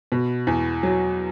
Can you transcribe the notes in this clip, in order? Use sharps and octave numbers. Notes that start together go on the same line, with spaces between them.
B2
E2
F#3